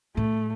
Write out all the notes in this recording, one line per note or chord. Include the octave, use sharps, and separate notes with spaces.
A2 A3